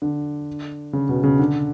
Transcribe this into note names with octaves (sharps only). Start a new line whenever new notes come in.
D3
C#3
B2
C#3
D3